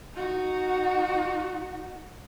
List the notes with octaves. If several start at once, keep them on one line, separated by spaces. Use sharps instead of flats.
D#4 F#4